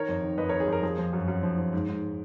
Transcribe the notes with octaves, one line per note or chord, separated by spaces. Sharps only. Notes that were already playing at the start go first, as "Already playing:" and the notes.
Already playing: D#3 A#4 C#5
F2
D#3
F2 B4 D#5
A#4 C#5
D#3
G#4
F2 A#4
F3 G#4
F3
F#2
F#2
F3
F3
G#2
G#2